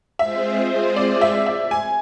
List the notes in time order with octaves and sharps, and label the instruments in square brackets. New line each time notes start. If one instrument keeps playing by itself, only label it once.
[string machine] G#3 C4 F4 G#4 C5 [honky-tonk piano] E5
[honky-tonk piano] D5
E5
E5
G#5